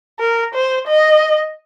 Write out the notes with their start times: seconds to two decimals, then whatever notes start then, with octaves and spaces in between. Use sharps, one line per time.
0.19 A#4
0.54 C5
0.87 D#5